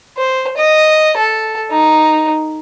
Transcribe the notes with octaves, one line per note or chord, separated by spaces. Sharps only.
C5
D#5
A4
D#4